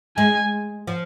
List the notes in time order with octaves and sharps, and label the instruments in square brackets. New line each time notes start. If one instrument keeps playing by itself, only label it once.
[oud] G#3 [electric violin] G#5
[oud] F3